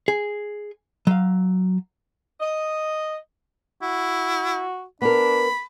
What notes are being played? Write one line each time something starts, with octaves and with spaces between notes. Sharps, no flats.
G#4
F#3 F5
D#5
E4 F#4
B3 D4 A#4 B5